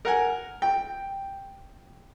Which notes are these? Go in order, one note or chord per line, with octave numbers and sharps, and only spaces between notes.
A#4 F#5 G#5
G5